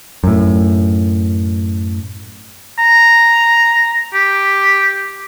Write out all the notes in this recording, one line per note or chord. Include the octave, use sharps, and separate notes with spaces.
F#2 A2
A#5
G4